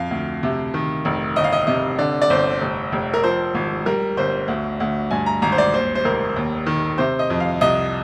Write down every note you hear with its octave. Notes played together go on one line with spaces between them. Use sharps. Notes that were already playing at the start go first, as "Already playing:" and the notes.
Already playing: F2 F5
D2
C3
D#3
F1
G1 D#5
F5
D#5
C3 D#5
D3 D5
D5
G1 C5
F1
F1
A#4
F3 C5
G#1
G3 A#4
G1 C5
D2
D2
G2 G#5
A#5
G#1 A#5
C5
D5
D#2 C5
C5
F1 A#4
D#2
D#3
C3 C5
D#5
F2
F5
C2 D#5